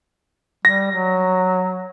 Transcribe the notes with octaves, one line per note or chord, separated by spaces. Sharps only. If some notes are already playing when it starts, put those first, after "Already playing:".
G3 A#6
F#3